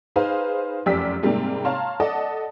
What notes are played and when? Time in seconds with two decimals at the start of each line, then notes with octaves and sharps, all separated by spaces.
0.16 D#4 G#4 B4 C5 F5
0.86 F1 F#2 G4 D5 E6 B6
1.23 G#2 C3 G3 A#3
1.65 C#5 F5 A5 A#5 C6
2.00 A4 D5 D#5 F#5 A5